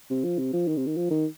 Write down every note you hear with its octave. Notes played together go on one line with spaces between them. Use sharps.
C3
F3
C3
F3
D#3
C3
D#3
F3
D#3